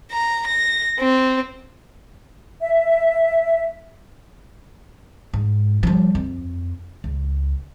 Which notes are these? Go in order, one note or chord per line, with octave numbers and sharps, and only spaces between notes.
A#5
A#6
C4
E5
G#2
F3 G3
F2
C#2